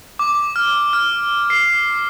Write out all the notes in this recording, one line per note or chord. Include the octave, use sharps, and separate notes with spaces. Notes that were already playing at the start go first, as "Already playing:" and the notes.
D6
F6
F6
C7